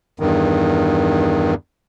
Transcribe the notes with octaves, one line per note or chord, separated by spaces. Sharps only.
E2 G2 D#3